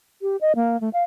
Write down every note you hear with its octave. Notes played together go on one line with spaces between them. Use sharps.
G4
D#5
A#3
A3
F5